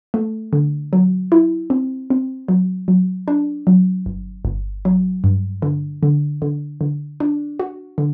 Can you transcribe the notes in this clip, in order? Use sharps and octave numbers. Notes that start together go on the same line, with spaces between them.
A3
D3
F#3
E4
C4
C4
F#3
F#3
D4
F#3
G1
G1
F#3
G2
D3
D3
D3
D3
D4
F#4
D3